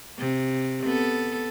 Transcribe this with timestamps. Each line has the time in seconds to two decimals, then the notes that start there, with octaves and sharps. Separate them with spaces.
0.18 C3
0.86 B3 A4